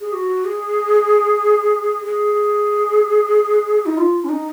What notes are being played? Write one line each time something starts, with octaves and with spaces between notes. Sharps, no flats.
G#4
F#4
G#4
G#4
D#4
F4
C#4
D#4